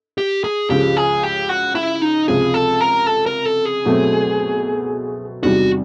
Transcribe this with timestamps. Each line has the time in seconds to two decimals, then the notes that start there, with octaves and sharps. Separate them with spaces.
0.18 G4
0.44 G#4
0.70 C#2 C#3 F3 G4
0.97 G#4
1.23 G4
1.49 F#4
1.75 E4
2.02 D#4
2.28 C#2 C3 F3 G#4
2.54 A4
2.81 A#4
3.06 A4
3.26 A#4
3.45 A4
3.65 G#4
3.85 B2 F#3 A3 C4
5.43 E2 C3 D#3 G3 F#4